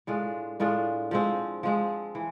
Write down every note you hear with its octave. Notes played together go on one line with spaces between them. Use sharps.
A2 G#3 D4 F4
A2 G#3 D4 F4
F3 G#3 C4
F3 G#3 C4
E3